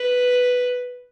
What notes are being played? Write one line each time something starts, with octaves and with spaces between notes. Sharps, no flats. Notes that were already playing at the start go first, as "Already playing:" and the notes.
Already playing: B4